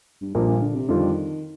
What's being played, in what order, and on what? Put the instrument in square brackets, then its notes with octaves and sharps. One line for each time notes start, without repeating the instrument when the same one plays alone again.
[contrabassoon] G2
[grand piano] A#1 A#2 F3 A#3 [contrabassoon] G2
[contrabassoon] G2
D3
C3
[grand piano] F2 D3 G3 D4 F4 [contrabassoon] D#3